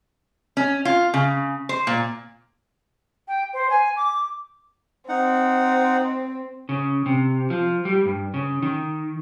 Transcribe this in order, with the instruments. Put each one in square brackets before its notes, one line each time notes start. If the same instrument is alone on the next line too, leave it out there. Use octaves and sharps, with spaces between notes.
[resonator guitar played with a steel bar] C#4
F4
C#3
C5
A#2
[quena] G5
C5
G#5
D6
[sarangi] C4 [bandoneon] D#4 F#5
[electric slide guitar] C#3
C3
F3
G3
G2
C#3
D#3